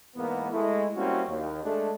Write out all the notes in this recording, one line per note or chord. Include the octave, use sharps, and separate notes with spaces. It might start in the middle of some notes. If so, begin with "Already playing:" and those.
E2 G#2 A#3 B3
G#3 A3 E4
G3 A#3 C4 C#4 E4 F#4
D#2
G#3 A3 D4 G#4 A4